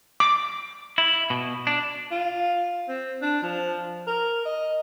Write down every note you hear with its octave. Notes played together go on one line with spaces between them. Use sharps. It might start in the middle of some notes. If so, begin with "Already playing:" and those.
D6
E4
B2
D4
F4
C4
D4
F3
A#4
D#5